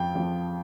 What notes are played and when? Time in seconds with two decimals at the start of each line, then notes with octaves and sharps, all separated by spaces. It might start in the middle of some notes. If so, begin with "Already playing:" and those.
Already playing: F2 F3 G5
0.15 F2 F3